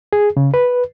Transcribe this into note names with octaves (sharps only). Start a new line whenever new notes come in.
G#4
C#3
B4